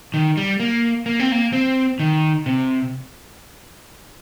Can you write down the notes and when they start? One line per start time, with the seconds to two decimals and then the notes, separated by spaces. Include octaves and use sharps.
0.14 D#3
0.37 G3
0.60 A#3
1.06 A#3
1.20 C4
1.32 A#3
1.53 C4
1.99 D#3
2.46 C3